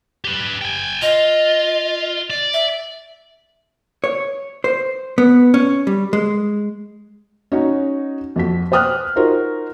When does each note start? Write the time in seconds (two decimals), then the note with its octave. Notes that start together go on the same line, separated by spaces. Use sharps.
0.25 G4 B4
0.61 G5 G#5
1.02 F4 D#5
2.30 D5
2.53 E5
4.04 C#5
4.64 C5
5.18 B3
5.54 C#4
5.87 G3
6.13 G#3
7.52 C#4 D#4 F#4
8.36 F2 F#4 B6
8.72 C5 G5 D#6 F6 F#6
9.16 D#4 F4 F#4 A#4 C5